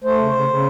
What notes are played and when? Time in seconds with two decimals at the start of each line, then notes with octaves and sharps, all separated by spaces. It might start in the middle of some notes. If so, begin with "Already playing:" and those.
0.04 A3 C5
0.18 C#3
0.33 C#3
0.48 C#3